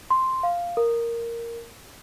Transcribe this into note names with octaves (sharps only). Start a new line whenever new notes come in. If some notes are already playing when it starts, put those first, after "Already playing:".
C6
F5
A#4